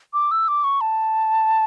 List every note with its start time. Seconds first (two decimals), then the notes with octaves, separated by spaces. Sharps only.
0.14 D6
0.31 E6
0.48 D6
0.64 C#6
0.81 A5